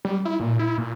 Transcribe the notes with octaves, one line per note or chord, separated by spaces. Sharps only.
G3
E4
A#2
E4
A#2